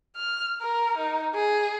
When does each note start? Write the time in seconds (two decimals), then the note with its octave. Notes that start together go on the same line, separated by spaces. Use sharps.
0.17 F6
0.62 A#4
0.98 D#4
1.35 G#4